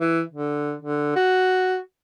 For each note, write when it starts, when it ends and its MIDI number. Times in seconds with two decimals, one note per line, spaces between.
0.01 0.21 52
0.32 0.74 50
0.83 1.11 50
1.16 1.78 66